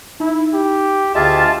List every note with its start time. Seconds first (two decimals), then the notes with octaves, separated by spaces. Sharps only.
0.20 D#4 E4
0.53 G4
1.15 D2 F4 G4 G#4 D#5 E5 A5